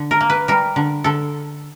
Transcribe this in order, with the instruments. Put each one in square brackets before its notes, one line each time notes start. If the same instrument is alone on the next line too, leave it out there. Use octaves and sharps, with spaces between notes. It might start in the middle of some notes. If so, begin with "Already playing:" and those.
Already playing: [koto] D3
A#4
A#3
B4
G3 A#4
D3
D3 A4